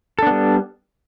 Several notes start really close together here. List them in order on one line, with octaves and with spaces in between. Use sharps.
A4 D4 B3 G3